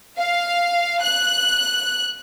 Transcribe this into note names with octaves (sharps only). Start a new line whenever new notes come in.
F5
F#6